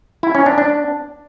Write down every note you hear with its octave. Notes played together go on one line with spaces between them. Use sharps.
E4
C#4
D4
D4